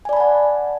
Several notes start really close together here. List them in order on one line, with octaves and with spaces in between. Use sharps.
G#5 D5 B5 A5 F#5